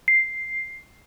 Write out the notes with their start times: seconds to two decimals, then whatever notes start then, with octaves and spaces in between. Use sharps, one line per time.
0.08 C7